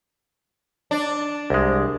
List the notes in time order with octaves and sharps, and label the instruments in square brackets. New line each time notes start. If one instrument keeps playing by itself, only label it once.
[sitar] D4
[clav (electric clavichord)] C2 G#3